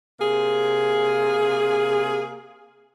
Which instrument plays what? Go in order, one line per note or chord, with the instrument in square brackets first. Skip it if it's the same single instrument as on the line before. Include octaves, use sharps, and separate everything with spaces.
[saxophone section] C3 A#3 G#4